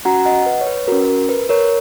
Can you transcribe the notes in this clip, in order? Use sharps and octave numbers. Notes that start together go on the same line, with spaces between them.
C#4 F#4 F#5 A#5
D#5 F#5
B4
C#5
B4
C#4 F#4 A#4
A#4
B4
A#4 C#5